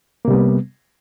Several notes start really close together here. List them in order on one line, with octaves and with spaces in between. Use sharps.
A#3 C3 G3 B3